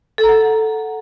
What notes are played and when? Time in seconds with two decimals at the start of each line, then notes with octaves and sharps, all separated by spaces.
0.18 A4
0.24 A#5
0.29 F#5